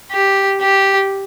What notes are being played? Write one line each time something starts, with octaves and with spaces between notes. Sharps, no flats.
G4
G4